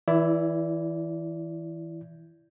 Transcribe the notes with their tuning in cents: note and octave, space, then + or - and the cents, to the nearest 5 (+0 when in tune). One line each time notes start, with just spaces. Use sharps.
E3 -25 E4 +15 D5 -15